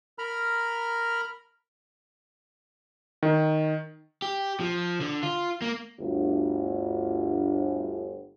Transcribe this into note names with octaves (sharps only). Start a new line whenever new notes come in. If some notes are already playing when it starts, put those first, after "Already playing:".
A#4 A#5 B5 F6
D#3
G4
F3
D3
F4
A#3
G1 D2